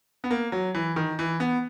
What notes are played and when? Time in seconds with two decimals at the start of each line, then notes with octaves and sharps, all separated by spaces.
0.24 B3
0.31 A#3
0.52 F#3
0.75 E3
0.96 D#3
1.19 E3
1.40 B3